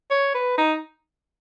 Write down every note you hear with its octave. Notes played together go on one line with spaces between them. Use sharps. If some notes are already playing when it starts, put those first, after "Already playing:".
C#5
B4
D#4